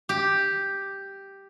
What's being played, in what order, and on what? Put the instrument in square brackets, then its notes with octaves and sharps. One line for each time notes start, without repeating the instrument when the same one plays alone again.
[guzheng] G4